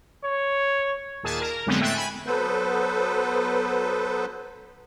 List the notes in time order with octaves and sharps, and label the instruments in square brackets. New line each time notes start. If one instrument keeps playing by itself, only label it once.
[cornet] C#5
[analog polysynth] D#2 A#2 G#4 A5
A#4
F2 D3 F#3 G#3 B3 C4
A2 A3 E5 G5 F#6 A6
G#5 B5
[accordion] F#3 B3 A4 B4 C5